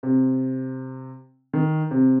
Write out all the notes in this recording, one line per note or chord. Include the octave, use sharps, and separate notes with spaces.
C3
D#3
C3